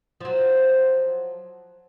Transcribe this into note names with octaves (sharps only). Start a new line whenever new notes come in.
F3 F#3